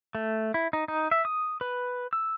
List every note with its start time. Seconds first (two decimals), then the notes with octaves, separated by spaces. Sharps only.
0.15 A3
0.54 E4
0.73 D#4
0.88 D#4
1.11 E5
1.25 D#6
1.61 B4
2.13 E6